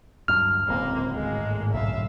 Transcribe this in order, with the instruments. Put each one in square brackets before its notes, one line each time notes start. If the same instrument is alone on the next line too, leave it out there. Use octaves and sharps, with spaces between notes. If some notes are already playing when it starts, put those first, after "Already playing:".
[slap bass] D2 G2 F#3 [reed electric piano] F6
[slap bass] D1 C#2 C#3 [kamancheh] A#3 [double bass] C4
[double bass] G#1 A2 [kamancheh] G#3 A#3
[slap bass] B1 F#2 D3 [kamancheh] E5 F5